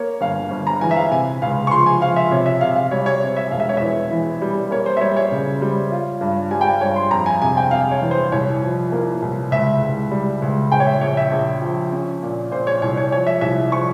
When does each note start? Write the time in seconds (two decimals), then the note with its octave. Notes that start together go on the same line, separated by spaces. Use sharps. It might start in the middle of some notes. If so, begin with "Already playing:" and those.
Already playing: A#3 C#5
0.21 G1 F5
0.51 G1
0.67 A#5
0.81 E3 G#5
0.91 E5
0.96 F5
1.11 C3 G#5
1.42 C#2 F5
1.67 C#6
1.71 F3 C6
1.86 G#5
2.01 F3 F5
2.16 E5
2.31 C3 C#5
2.46 E5
2.61 C3 F5
2.76 F5
2.91 G3 C#5
3.06 C#5
3.22 C4
3.37 E5
3.51 E1 F5
3.60 E5
3.69 C#5
3.77 E2 E5
4.11 E3
4.42 G3
4.71 A#3 C#5
4.86 C5
4.97 E5
5.01 G3 C#5
5.17 C#5
5.32 C#3
5.62 G3
5.92 F4
6.21 G2
6.51 G3 G#5
6.61 G5
6.67 G#5
6.81 G2 C#5
6.96 C6
7.11 F2 A#5
7.26 G#5
7.42 C3 G#5
7.57 G5
7.71 C3 F5
7.91 C#5
8.02 E3
8.11 C5
8.32 C2 C#5
8.62 F3
8.92 A#3
9.22 C2
9.51 C#2 E5
9.81 C#2
10.11 G3
10.42 C#2
10.71 A#1 G5
10.80 C#5
10.87 E5
11.01 A#1 C#5
11.17 E5
11.31 A#1
11.61 F3
11.92 C#4
12.22 A#2
12.51 A#2 C5
12.67 C#5
12.82 C2 C#5
12.97 C#5
13.12 F3 C#5
13.27 E5
13.41 C2 E5
13.71 F3 C#6